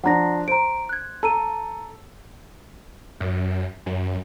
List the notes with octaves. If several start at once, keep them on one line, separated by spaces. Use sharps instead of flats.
F3 D4 F#5 A#5 A#6
C5 A#5 D7
F#6 G#6
A4 A5 A#5 D#7
F#2
F#2